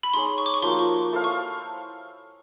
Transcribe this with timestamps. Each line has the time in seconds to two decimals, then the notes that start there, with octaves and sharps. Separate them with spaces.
0.03 B5
0.13 D#4 G#4 C#5 C6
0.38 C#6
0.46 D6
0.54 C#6
0.62 F3 A#3 D#4 F#4 C6
0.79 C#6
1.12 E4 A4 C5 F5
1.24 C#6